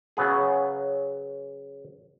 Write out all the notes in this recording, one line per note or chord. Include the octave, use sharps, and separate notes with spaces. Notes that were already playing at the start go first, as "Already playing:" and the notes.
C#3 F#3 B3 G#4